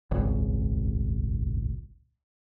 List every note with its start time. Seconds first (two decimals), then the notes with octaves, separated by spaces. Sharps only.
0.11 D#1 G#1 C#2